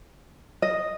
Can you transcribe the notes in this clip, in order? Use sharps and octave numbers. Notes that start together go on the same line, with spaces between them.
D#5